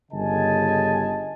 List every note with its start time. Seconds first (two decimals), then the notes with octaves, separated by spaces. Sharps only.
0.12 G1 C#3 D#5 G#5 A5